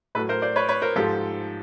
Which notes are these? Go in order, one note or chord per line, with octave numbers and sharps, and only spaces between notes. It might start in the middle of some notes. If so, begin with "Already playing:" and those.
A2 F#3 A4 B4
A#4 C5
C5 D5
B4 C#5
B4 C#5
A#4 C5
G#2 F3 G4 A4